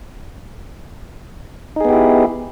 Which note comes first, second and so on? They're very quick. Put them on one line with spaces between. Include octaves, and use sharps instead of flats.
D#4 G#4 B3 G4 E4